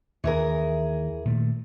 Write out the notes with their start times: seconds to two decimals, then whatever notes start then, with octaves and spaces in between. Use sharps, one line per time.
0.24 D#2 E3 G#4 A#4
1.25 A#2 D#3 A3